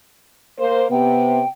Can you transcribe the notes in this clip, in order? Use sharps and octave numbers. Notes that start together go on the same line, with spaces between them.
A#3 C5
C3 B3 G5